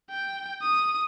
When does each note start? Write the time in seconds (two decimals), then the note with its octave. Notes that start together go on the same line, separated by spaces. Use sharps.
0.11 G5
0.62 D#6